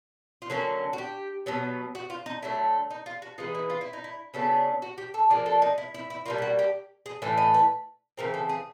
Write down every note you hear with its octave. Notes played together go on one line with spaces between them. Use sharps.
F4
D3 F#3 A#3 C#4 F#4
F#4
G4
B2 F#3 B3
F#4
F4
D#4
D3 F#3 A3 E4
D#4
F4
F#4
E3 G#3 B3 D#4 F4
E4
F4
E4
D#4
E4
C#3 F#3 B3 D4 A4
F#4
G4
A4
F3 A#3 D4 G#4
A4
D#4
E4
E4
E4
B2 G3 A#3 F4
G4
F#4
G4
G#4
A2 E3 A3 A4
D#5
B4
C#3 E3 C4 A#4
A4
G#4